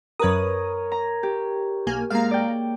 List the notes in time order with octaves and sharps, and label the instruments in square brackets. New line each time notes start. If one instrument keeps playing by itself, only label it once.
[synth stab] F#2 B4 D#6 [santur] A#4 C#5
[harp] A#5
G4
[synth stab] B1 A#3 G#5
[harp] G#2 A#3 [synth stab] F5 A#5
[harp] D5 G5